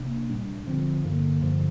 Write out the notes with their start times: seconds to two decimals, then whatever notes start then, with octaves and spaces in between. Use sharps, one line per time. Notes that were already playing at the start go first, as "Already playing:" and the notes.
Already playing: C3 A#3 D4
0.29 A#2 G3 D4
0.67 D3 F3 C4
1.04 G2 D3 A#3
1.42 G2 D3 F3